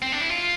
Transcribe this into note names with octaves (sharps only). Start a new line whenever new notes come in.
C4
D4
E4
F4